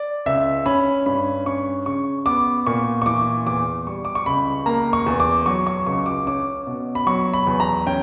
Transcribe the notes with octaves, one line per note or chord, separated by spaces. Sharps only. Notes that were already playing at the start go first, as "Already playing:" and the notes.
Already playing: D5
C#2 E5
C#4 B5
G2 B5
C#4 C#6
C#3 C#6
B3 D6
A#2 C#6
C#6
E3 D6
E2 D6
G3 C#6
D6
C#6
C#2 B5
A#3 A#5
C#6
E2
D6
F#3 C#6
C#6
C#2 C#6
D6
C#4 D6
B2
B5
F#3 C#6
B5
E2
A#5
C#4 G5